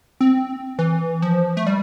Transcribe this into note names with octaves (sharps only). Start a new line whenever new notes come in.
C4
E3
F3
A3
G3